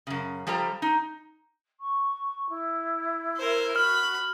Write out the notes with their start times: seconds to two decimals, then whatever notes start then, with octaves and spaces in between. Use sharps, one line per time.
0.07 F#2 C#3
0.47 F3 G3 F4 A4 A#5
0.82 D#4
1.80 C#6
2.49 E4
3.37 A#4 C5
3.76 F#4 B5 F6